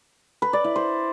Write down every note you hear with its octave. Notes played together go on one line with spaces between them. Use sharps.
B4
D5
E4
C5